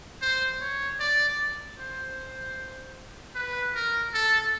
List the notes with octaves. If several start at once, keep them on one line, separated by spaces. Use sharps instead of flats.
C5
C#5
D5
C5
B4
A#4
A4